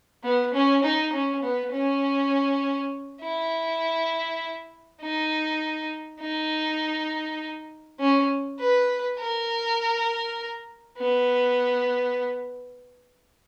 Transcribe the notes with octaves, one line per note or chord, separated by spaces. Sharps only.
B3
C#4
D#4
C#4
B3
C#4
E4
D#4
D#4
C#4
B4
A#4
B3